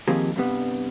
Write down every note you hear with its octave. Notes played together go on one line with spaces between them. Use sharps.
D#3 F3 A#3 C4 G4 G#4
G2 C3 G3 B3